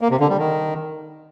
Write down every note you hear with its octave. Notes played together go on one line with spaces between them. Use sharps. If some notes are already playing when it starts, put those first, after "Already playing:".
A#3
C3
D3
G3
D#3